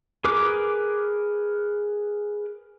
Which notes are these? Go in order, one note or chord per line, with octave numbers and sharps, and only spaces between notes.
G#4 A#4 B4 D6